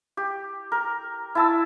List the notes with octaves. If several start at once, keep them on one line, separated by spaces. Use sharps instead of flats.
G4
A#4
E4 A5 E6